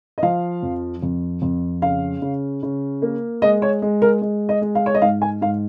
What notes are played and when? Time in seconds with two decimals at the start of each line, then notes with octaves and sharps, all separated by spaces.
0.18 D#5
0.23 F3 F5
0.63 F2
1.03 F2
1.42 F2
1.82 C#3 F5
2.22 C#3
2.63 C#3
3.02 A#3
3.42 G#3 D#5
3.62 C#5
3.82 G#3
4.02 A#4
4.22 G#3
4.49 D#5
4.62 G#3
4.75 F5
4.86 C#5
4.95 D#5
5.02 G#2 F5
5.22 G#5
5.41 G#2 F5